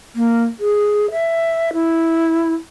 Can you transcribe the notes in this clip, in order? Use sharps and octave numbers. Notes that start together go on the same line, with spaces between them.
A#3
G#4
E5
E4